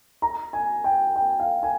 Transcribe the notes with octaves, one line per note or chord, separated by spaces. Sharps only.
A#5
G#5
G5
G5
F5
G#5